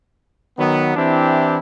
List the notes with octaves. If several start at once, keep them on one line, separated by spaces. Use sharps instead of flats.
D#3 F#3 B3
E3 C4 D4 E4 G4